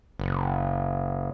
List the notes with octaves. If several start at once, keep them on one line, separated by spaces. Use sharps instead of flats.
F#1